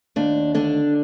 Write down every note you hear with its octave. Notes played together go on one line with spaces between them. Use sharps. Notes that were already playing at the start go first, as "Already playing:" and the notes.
D#2 D4
D3 D4